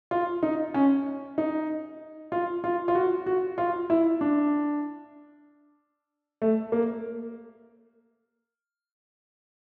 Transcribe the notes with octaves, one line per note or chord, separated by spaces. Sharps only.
F4
D#4
C#4
D#4
F4
F4
F4
F#4
F#4
F4
E4
D4
A3
A#3